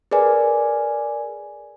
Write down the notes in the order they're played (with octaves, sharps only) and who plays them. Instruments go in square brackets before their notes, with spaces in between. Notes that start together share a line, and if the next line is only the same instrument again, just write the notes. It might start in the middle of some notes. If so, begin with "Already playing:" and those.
[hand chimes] G#4 A#4 B4 D5 G#5